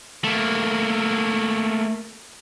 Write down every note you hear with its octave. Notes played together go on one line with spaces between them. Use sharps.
A3 A#3